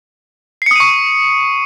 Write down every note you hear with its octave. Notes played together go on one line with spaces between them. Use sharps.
C#6 D#6 C7 C#7 D#7